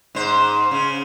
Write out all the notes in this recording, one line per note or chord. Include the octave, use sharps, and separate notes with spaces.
G#2 C5
C#3